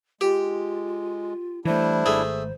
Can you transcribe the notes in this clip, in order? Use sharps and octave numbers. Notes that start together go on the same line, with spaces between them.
G#3 F4 G4
E3 G3 A3 D4 E4 C5
G#1 A3 G#4